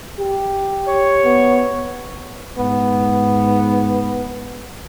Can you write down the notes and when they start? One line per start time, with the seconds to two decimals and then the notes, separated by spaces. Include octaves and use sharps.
0.20 G4
0.88 C#5
1.25 B3
2.58 G#2 B3